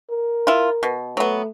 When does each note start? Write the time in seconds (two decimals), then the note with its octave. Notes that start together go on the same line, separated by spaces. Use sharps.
0.10 A#4
0.47 E4 F4
0.83 B2
1.17 F#3 A3 B3